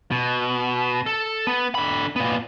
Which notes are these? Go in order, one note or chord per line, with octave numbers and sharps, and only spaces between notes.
B2
A4
B3
D3 B5
A#2 B3